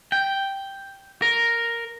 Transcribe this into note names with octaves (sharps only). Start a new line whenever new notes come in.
G5
A#4